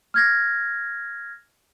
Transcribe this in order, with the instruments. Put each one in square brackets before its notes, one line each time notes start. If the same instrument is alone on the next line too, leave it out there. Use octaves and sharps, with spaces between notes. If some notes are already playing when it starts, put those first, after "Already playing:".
[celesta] F6 G#6 A#6